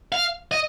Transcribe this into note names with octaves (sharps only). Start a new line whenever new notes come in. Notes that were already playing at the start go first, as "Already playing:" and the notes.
F5
D#5